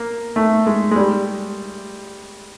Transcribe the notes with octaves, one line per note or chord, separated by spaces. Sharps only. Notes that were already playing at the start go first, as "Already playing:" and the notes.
Already playing: A#3
A3
G#3
G#3
G3